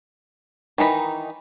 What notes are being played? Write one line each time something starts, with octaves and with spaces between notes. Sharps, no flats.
D#3 E3 D#4 B5